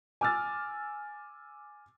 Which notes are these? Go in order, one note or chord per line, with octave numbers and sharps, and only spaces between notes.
G#5 D6 E6 F6 A6